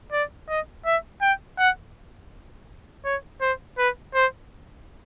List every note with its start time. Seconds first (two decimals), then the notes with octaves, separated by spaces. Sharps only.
0.12 D5
0.49 D#5
0.86 E5
1.22 G5
1.59 F#5
3.05 C#5
3.41 C5
3.78 B4
4.15 C5